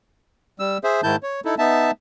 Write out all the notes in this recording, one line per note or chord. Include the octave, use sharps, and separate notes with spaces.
G3 E6
G#4 C5 E5
G#2 D#3 E4 A5 G6
C#5
D#4 E4 A4
B3 D#4 E5 A5